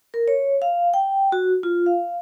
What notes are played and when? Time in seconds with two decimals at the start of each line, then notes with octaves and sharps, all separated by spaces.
0.14 A#4
0.28 C#5
0.62 F5
0.94 G5
1.32 F#4
1.63 F4
1.86 F5